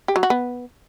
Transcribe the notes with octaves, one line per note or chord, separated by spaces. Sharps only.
G4
F#3
F#4
B3